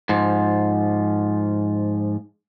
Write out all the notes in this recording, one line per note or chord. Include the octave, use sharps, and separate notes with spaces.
G#2 F3